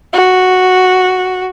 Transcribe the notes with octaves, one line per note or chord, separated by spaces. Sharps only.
F#4